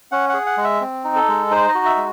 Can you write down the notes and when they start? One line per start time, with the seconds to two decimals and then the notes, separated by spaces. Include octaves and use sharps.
0.12 C#4 F#5
0.29 G#4 F#5
0.46 F#5
0.57 G#3
0.64 E5
0.81 C4
1.04 D#4
1.16 A4
1.28 G#3
1.51 D#4 C5
1.69 D#5
1.75 F#4
1.86 E5
1.97 G#3